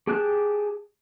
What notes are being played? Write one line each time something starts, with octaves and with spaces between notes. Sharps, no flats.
G4 G#4 G5 A5 F#6